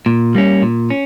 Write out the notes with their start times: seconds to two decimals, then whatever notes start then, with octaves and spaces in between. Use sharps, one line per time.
0.06 A#2
0.35 G3 A#3 C#4
0.62 A#2
0.90 C#4